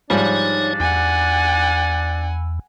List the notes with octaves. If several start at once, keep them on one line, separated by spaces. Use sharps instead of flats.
G#2 F3 G3 D4 D#4 C#5
E2 F#5 G#5